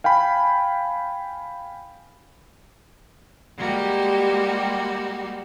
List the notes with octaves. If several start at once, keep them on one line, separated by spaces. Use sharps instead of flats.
F5 G5 G#5 B5
G3 G#3 A#3 F#4 G4